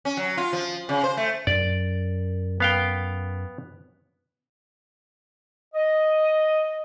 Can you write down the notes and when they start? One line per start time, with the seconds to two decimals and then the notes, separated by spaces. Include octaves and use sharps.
0.05 C#4
0.17 F#3
0.37 F4
0.53 F3
0.89 C#3
1.04 C5
1.17 A3
1.47 F#2 D5
2.60 B3 F5 G5
5.74 D#5